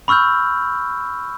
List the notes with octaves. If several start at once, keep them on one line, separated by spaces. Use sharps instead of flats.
B5 C#6 E6 F6 G6